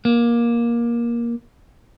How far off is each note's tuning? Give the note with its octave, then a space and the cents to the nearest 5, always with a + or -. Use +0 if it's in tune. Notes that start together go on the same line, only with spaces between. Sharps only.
A#3 +15